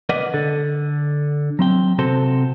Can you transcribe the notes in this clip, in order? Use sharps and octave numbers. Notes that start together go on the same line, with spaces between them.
A#4 B4 D5 D#5 F#5
D3 A4
F#3 C4 G5
C3 C4 F#4 A4 C5